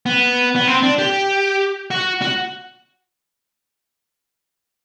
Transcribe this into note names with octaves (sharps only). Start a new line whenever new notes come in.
B3
B3
C4
D4
G4
F#4
F#4